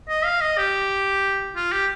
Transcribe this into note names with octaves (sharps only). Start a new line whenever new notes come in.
D#5
F5
D#5
G4
F4
G4